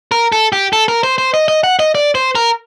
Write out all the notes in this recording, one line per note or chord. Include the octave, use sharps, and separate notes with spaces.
A#4
A4
G4
A4
A#4
C5
C5
D#5
D#5
F#5
D#5
D5
C5
A#4